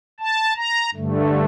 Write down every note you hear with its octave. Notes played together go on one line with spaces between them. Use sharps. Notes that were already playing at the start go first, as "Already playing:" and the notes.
A5
A#5
G2 D3 A3